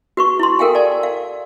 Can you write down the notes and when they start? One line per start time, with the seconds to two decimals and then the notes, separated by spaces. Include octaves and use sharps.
0.17 F#4 B4 C#6
0.39 E4 C6
0.59 A4 A#4 F5 G5 G#5
0.75 D5 A5
1.03 F5